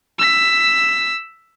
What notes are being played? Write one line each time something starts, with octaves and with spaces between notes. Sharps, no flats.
E6 B6